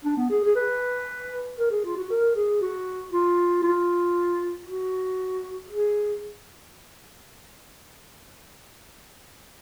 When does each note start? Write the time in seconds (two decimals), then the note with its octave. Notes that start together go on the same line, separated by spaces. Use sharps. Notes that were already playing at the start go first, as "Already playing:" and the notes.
0.05 D4
0.17 B3
0.30 G#4
0.44 G#4
0.56 B4
1.59 A#4
1.71 G#4
1.85 F4
1.97 F#4
2.10 A#4
2.36 G#4
2.61 F#4
3.12 F4
3.63 F4
4.66 F#4
5.69 G#4